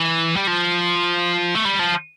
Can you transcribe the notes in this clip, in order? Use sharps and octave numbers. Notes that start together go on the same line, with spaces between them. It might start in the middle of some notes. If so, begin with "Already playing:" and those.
Already playing: E3
G3
F3
A3
G3
F3